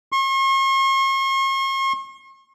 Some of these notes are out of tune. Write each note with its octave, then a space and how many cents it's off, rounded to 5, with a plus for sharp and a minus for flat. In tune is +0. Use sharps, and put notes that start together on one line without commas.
C#6 -45